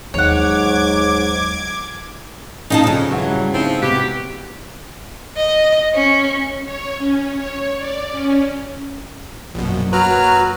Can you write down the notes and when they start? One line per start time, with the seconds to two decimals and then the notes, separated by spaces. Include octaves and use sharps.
0.14 D#2 G#2 F#3 C#5 F#5 D6 G#6
2.70 D2 A#2 C#4 D#4 D#5 F5 A5
2.84 F2 C#3 G#3
3.10 D#2 E3 F#3 F#5
3.28 G2 G3
3.54 F3 C4 D#4 E4
3.82 C3 B3 E4 F#4 G4
5.37 D#5
5.94 C#4
6.65 C#5
6.98 C#4
7.36 C#5
7.78 D5
8.12 C#4
9.55 A#1 F#2 B2 A#3
9.93 F#3 F#4 B4 A#5 F6